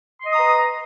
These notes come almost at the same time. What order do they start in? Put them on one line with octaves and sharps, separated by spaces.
C6 D#5 D#6 A#5 B4